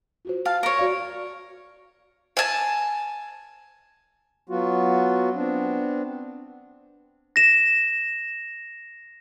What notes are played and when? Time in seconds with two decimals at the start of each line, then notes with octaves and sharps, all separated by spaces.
0.25 F4 F#4 C5
0.45 F5 A5
0.63 A#4 C#5
0.78 F#4 D5 F5
2.37 G#5 A5
4.49 F#3 B3 F4 F#4
5.34 B3 C4 D4
7.36 A#6 E7